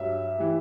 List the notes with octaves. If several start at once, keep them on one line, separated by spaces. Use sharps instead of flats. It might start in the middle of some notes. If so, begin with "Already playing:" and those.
Already playing: G2 F#3 E5
E3 G3